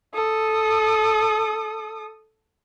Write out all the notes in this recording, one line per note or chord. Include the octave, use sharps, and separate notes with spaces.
A4 D#6